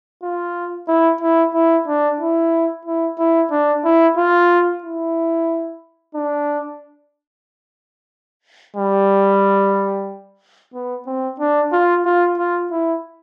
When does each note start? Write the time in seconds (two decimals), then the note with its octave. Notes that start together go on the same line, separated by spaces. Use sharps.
0.23 F4
0.88 E4
1.21 E4
1.54 E4
1.87 D4
2.20 E4
2.85 E4
3.19 E4
3.51 D4
3.84 E4
4.17 F4
4.83 E4
6.15 D4
8.77 G3
10.74 B3
11.07 C4
11.40 D4
11.72 F4
12.05 F4
12.38 F4
12.71 E4